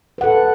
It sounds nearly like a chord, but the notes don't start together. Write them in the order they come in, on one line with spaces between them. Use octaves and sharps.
B4 F#5 A4